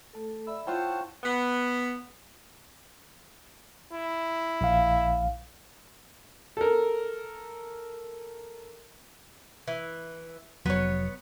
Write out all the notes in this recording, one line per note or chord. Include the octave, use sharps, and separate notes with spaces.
A3 A4
D5 E5 B5 E6
E4 F4 C5 C#5 F#5 G5 A5
B3
E4
A#1 F5
A4 A#4
E3
F1 F#3 B3 C#5